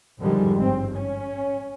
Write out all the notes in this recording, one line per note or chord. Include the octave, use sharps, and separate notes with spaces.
F2 G#2 D3 D#3 G3 G#3
G#1 G2 C4
C#4